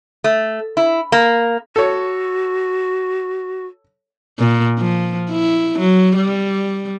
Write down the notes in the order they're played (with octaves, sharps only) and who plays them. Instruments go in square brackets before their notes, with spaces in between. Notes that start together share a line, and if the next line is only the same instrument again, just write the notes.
[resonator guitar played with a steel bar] A3
E4
A#3
[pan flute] F#4 [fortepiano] A4 C#5
[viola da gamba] A#2
F3
E4
F#3
G3